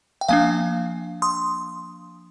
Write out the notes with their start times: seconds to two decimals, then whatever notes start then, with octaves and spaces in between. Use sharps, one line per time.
0.21 G5
0.28 F3 A#3 D4 F5 G#5
1.22 C6 D#6